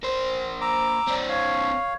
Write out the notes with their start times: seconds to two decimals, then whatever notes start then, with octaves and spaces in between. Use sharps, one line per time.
0.03 A#3 C5
0.61 A#5 D6 E6
1.08 C4 D4
1.29 C#5 F5